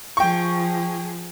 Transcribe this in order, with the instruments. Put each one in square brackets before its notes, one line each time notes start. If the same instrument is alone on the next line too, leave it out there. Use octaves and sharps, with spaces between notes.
[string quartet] F3 G#4 [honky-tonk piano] G5 C#6